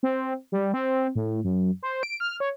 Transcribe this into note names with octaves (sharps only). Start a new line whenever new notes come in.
C4
G3
C4
A2
F#2
C5
D7
F6
C#5